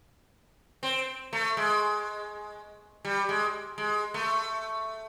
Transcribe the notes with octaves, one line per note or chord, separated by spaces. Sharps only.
C4
A3
G#3
G3
G#3
G#3
A3